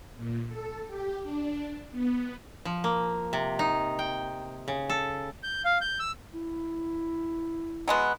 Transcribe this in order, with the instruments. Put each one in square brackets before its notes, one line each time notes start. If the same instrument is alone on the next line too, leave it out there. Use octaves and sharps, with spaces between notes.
[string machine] A#2
A4
G4
D4
B3
[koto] F3
A#3
C3
D#4
G5
C#3
A4
[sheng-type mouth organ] G6
F5
G6
E6
[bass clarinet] E4
[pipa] F#3 G#3 B3